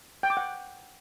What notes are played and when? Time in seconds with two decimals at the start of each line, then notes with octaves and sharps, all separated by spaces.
0.23 G5
0.30 D6
0.37 F#5